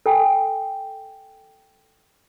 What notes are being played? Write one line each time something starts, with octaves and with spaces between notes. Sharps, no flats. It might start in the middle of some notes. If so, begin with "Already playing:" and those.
A4 G5 G#5